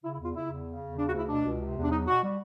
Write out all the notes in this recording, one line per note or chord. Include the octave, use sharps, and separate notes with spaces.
C#3 E4
E4
E2
F4
C#3 E4
E2
C#3
E2
C#3 D4
F#4
D2 E4
B2 D4
C#2
C3
E2
D4
F#3 D#4
B2 F#4
G3